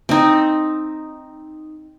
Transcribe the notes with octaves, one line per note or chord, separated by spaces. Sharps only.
C4 D#4